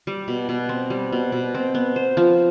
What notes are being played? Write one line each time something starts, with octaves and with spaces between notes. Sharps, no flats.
G3
B2
B2
C4
G3
B2
B2
C4
B3
C5
F3